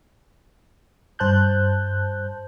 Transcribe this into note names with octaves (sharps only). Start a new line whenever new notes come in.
G2 C5 A5 F#6 G6